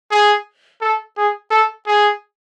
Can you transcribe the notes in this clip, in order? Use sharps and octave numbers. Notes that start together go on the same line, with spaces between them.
G#4
A4
G#4
A4
G#4